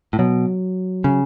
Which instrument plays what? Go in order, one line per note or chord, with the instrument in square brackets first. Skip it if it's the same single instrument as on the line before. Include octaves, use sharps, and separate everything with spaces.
[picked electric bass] A2
[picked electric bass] B2 [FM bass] F#3
[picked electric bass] C#3